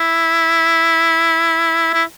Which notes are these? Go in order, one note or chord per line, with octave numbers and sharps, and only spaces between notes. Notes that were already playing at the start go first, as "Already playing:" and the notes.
Already playing: E4
E4